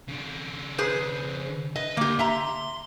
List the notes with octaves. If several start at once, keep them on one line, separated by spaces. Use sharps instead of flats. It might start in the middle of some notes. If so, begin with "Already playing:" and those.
C#3 D4
G#4 B4 C5
B4 D#5
D2 A#3 G4
E5 A#5 C6